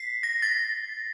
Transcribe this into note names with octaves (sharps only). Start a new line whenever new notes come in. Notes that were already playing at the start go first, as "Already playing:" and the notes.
Already playing: B6 C7
A#6
A6